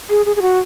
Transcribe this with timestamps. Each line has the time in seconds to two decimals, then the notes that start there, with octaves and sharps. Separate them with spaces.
0.09 G#4
0.26 G#4
0.36 G#4
0.42 F#4